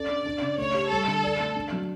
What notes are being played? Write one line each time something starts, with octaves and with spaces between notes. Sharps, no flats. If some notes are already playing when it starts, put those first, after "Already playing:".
Already playing: C#4 A4 D5
D4
D4
C#3
A3 C#5
G4
G3 A4
D3
D5
A3
D4
F#3